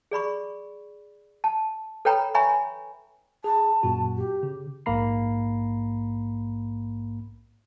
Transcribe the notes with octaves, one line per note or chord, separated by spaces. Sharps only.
G#4 D5 B5 C#6
A5
A4 B4 C#5 G5 A#5 B5
C#5 E5 G#5 A#5 B5 C#6
G#4 A5
F#2 A#2 F#4
G4
C#3
A#1 G#2 A#3 A#5 B5 C7